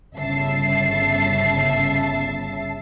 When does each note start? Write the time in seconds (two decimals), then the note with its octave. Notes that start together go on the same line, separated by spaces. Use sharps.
0.15 G1 C#3 E5 A5 C7